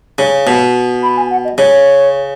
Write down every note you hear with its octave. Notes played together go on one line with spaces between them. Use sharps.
C#3
B2
B5
G#5
F#5
D#5
C#3 C#5